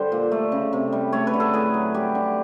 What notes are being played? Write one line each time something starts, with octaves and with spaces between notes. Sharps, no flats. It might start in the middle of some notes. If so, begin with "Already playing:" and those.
Already playing: D3 G3 C5
A#2
A3
C#3
C3
G3
A3 C#5
B4
D3
A4
A2 G#4
F#3
G3 G4
D3